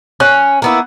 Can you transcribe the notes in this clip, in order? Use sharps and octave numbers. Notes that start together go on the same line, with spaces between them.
C#4 F#6
A#3 B3 E4